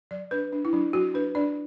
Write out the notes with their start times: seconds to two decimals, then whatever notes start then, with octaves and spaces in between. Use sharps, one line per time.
0.11 F#3 D5
0.31 D4 B4
0.53 D4
0.65 E4
0.73 F#3 D4
0.93 F#3 F#4
1.14 D4 B4
1.35 D4 D5